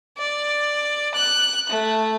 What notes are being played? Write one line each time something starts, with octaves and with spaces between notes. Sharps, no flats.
D5
F#6
A3